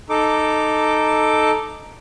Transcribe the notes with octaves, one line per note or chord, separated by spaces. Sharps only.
D#4 A4 D6